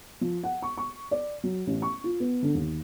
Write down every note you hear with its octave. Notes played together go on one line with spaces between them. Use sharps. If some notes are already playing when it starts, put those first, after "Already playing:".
F3
F#5
C#6
C#6
D5
F#3
A1
C#6
F4
B3
D3
D#2